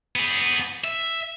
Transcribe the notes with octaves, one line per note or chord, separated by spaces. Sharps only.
B3 G#4
E5